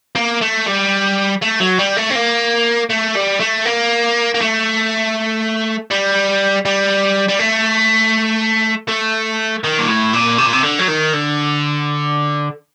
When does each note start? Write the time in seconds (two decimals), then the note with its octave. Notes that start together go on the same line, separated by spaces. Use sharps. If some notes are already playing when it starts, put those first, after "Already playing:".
0.16 A#3
0.42 A3
0.67 G3
1.42 A3
1.60 F#3
1.79 G3
1.97 A3
2.10 C4
2.16 A#3
2.90 A3
3.16 G3
3.40 A3
3.66 A#3
4.35 A#3
4.41 A3
5.91 G3
6.65 G3
7.28 G3
7.39 A3
8.88 A3
9.64 D#3
9.79 A#2
9.88 A2
10.13 A#2
10.38 C3
10.46 A#2
10.53 C3
10.64 D3
10.79 F#3
10.88 D#3
11.13 D3